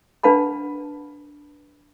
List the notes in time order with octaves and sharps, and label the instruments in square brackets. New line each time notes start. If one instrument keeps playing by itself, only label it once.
[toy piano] D4 B4 F#5 A5 B5